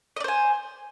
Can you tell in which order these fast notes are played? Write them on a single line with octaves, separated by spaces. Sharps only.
D#5 D5 C5 G#5